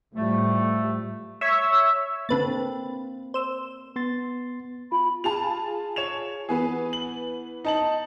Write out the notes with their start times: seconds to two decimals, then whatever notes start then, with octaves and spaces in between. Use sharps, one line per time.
0.15 A2 F3 G3 A3
1.41 C#5 E5
2.29 D3 A#3 C4 B4 A6
3.34 C5 E6
3.96 B3 C6 A6
4.92 F4 B5
5.24 F4 G#4 A5 F7
5.96 C#5 E7 F7
6.49 E3 B3 G#4 B4
6.93 F#7
7.65 D#4 A5 F#7